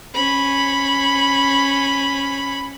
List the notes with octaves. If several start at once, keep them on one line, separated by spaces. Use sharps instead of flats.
C#4 B5